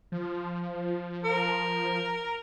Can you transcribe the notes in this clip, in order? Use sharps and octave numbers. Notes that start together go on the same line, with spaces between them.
F3
A#4